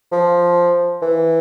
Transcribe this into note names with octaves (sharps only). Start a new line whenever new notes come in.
F3
E3